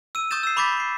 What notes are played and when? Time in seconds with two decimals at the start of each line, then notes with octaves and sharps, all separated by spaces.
0.15 E6 D#7
0.31 C#6 D#6 G6 A6 E7
0.43 E6 C7
0.57 B5 C#6 D6 G6 A6 B6
0.80 C7